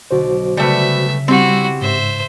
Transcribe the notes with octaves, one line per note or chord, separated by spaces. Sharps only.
B1 D3 F#4 C5 D5
C#3 G3 A3 B4 E5
G3 C4 E4 F#4 G4
G#2 C5 E5